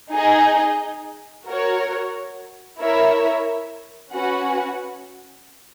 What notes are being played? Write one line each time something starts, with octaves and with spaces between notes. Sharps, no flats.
D#4 G#4 D#5
F#4 A#4 C#5
E4 A#4 C#5 E5
C#4 F#4 B4 F#5